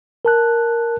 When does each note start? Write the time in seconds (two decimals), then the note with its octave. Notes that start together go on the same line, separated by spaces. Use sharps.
0.25 A#4 A5 F#6